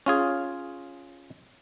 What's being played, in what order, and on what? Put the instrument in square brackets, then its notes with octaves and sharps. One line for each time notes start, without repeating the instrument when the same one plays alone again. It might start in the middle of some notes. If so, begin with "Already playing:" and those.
[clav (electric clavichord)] C#4 F4 G#4